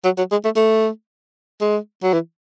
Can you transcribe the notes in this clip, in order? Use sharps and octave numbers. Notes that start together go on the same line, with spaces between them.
F#3
F#3
G#3
A3
A3
G#3
F#3
E3